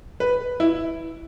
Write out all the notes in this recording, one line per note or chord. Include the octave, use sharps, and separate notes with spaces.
B4
E4